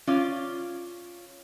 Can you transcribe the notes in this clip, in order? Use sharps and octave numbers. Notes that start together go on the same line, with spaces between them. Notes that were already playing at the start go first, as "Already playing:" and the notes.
C#4 F4 D5